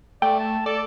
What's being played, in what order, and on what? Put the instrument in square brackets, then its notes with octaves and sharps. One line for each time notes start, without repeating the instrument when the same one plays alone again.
[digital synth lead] A3 [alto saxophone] D5 [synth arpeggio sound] G5
[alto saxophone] A5
[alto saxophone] A4 [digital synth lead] D5